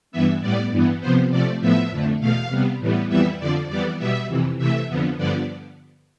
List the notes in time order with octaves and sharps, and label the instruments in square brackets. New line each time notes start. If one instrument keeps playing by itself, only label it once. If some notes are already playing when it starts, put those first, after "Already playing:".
[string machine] G2 E3 B3 E5
A2 G3 B3 D5
G2 E3 B3
C3 F3 B3 C5
C3 F3 A3 D5
A2 F3 B3 E5
F2 D3 A3
E2 B2 A3 F5
C3 G3 B3
A2 E3 G3 B3
F2 E3 G3 B3 E5
F2 D3 F3 D5
F2 E3 G3 B3 D5
B2 G3 B3 E5
F2 C3 E3
C3 E3 A3 E5
F2 D3 F3 B3
G2 D3 F3 B3 D5